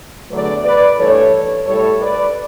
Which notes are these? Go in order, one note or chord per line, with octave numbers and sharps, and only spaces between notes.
E2 D3 F#3 A3 B4 D5
B4 D5
G2 E3 A3 A4 C#5
A2 G3 A4 C#5
B4 D5